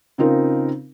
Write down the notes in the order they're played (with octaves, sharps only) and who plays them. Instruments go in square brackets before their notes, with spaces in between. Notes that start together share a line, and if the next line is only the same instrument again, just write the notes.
[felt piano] C#3 C4 D#4 F4 A#4